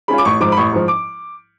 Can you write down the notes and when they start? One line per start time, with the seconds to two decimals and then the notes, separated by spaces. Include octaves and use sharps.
0.08 G#3 C#4 F4 B5
0.18 D6
0.25 A1 C#6
0.41 G#2 F3 D6
0.52 B5
0.57 A1 C#6
0.72 G#2 F3
0.88 D6